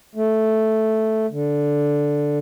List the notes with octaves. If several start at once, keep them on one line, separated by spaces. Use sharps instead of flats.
A3
D3